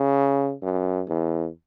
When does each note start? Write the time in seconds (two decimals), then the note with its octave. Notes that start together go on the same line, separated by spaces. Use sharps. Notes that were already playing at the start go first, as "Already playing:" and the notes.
Already playing: C#3
0.63 F#2
1.08 E2